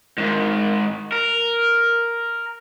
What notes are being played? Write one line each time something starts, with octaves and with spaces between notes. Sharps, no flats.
G#2 D#3
A#4